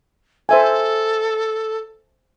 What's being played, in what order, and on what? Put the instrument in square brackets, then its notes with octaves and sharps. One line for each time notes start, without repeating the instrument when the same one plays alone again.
[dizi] A4 [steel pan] C5 E5 G#5